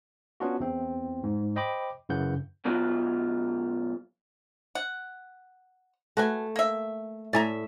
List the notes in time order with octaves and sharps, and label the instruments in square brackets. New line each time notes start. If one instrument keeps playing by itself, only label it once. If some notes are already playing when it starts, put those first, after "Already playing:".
[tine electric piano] B3 C#4 D4 F4 F#4
E2 C4
G#2
C5 D#5 G5 B5 D6
F#2 C#3 E3 F#5 G6
[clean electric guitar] F#2 B2 F#3 F4
[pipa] F#5
[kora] A3 [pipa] F#4 B4 G#5
[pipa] A#3 E5
[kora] A2 E5 [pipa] D5 G#5 A#5